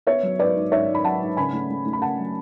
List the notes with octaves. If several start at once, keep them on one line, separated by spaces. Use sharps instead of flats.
B3 C#5 E5
F#3
G#2 B4 D5
G#2
G#2 C#5 E5
G#2
B5
F#3 F#5 A5
G#2
C#3 G#5 B5
A3
A3
A3
B5
C#3 F#5 A5
F#3